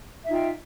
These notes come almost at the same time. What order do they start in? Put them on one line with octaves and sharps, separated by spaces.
E5 D#4 F4 G5